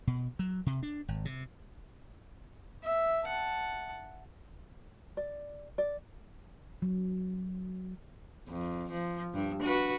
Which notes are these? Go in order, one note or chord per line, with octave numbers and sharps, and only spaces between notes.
B2
F#3
C3
D4
G#1
C3
E5
F#5 A5
D5
D5
F#3
F2
F3
G2
F#4 B4